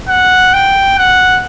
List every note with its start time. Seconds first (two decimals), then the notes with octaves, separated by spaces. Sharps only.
0.09 F#5
0.53 G5
0.98 F#5